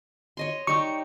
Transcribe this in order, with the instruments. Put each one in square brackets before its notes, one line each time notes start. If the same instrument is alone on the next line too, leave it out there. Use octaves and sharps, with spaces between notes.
[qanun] C#5 D#5 C6
[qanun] G3 D#4 G5 [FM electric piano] C#6